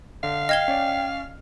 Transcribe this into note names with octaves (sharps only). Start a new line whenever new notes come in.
D3 F5
D#5 G5 F6 G#6 C7 E7 G7
C#4 D5